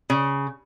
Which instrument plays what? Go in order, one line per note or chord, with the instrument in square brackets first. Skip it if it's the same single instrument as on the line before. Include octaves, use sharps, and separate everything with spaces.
[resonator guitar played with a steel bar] C#3